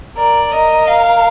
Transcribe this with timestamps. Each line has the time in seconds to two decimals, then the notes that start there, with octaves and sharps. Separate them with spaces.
0.17 A#4 D5
0.52 A#4 D#5
0.87 F5